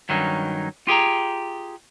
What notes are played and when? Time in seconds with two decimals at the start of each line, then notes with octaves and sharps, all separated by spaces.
0.09 G2 D#3 F#3 C#4 D#4
0.87 F4 G4 G#4 G5 A#5